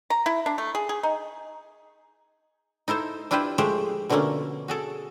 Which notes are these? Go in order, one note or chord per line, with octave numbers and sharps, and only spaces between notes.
A#5
E4
D4
A3
G#4
G#4
D#4
D#4 E4 A4 C5
D4 E4 F4 G4 B4 C5
F3 G#3 A3 G4 C5
B2 D3 F3 A3 A#3 C#4
F#4 G#4 A4